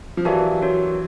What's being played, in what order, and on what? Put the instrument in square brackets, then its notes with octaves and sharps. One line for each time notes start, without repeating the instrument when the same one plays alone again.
[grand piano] F3
[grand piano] E3 F#3 [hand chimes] G4 A#4 D5 F5 A5
[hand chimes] C#4 F#4 A#4 C#5